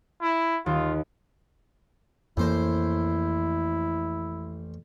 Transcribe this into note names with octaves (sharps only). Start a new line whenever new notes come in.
E4
D#2 F4
A1 F2 A#3 E4 C5